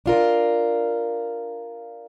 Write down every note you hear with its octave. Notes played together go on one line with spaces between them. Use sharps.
D4 F4 A#4